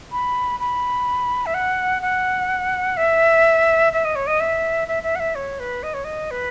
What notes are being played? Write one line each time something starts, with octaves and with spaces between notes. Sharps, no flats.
B5
B5
E5
F#5
F#5
E5
E5
D#5
C#5
D#5
E5
E5
E5
F#5
E5
C#5
B4
D#5
C#5
D#5
B4